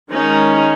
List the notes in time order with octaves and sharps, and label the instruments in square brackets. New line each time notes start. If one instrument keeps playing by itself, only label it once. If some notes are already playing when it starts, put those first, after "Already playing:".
[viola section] D#3 G#3 C#4 D#4